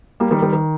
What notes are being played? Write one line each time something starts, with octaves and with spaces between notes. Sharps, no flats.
G3 A#3
D#3 G3
D#3 G3
D#3